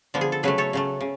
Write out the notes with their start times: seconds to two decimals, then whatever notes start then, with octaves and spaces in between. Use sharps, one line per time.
0.14 D3 F3 B3
0.21 G#4
0.32 A4
0.43 C#3 F#3 A3 G#4 B4
0.58 A4 C#5
0.73 C#3 F#3 A3
1.01 C#3